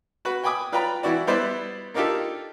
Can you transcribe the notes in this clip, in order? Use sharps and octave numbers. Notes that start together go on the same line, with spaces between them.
F#4 B4
G5 G#5 B5 D6 D#6
F4 B4 D5 G5 A#5 B5
E3 E4 F#4 D5
G3 B3 E4 B4 C5 D5
A#3 D4 D#4 F4 G4 A4